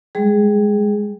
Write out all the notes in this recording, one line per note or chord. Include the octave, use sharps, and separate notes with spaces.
G3 G#3 G#4